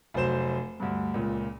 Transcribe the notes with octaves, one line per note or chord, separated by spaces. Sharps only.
F1 F#3 C5 E7
D2 G2
C#2 A#2